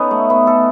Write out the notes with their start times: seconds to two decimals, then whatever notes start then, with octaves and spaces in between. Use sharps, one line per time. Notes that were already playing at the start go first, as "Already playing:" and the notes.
Already playing: B3 C#4 D#4 A4
0.11 A3
0.30 B3
0.47 A4